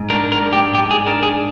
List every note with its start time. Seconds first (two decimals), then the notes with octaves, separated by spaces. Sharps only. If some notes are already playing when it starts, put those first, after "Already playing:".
Already playing: G#2
0.10 D4 A#4
0.32 A#4
0.42 G#2
0.53 G4
0.74 G#2 G4
0.91 G#4
1.06 D4 A#4
1.23 G#4